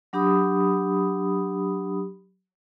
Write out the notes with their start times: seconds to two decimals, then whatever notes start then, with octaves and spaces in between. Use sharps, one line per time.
0.13 F#3 D4 G4 B5 D#6